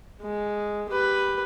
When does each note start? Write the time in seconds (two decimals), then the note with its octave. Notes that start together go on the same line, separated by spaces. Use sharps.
0.21 G#3
0.90 G4 B4